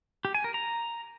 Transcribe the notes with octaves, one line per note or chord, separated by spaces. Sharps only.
G4
G#5
A#4
A#5